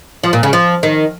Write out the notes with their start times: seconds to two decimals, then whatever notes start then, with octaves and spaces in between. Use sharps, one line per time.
0.24 F3
0.33 A#2
0.43 C#3
0.53 F3
0.83 D#3